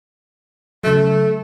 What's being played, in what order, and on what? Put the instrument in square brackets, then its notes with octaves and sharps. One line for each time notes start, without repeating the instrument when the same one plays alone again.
[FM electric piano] C#3 F#3 [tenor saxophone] A3